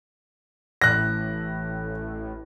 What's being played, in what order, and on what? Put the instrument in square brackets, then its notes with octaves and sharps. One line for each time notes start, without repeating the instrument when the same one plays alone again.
[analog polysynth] A1 A2 [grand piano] F#6 A#6